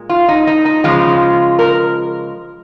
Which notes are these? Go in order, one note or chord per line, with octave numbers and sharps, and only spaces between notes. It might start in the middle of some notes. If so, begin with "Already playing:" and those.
Already playing: A#2 G#3
F4
D#4
D#4
D#4
C#3 F3 G#3 F4
A#4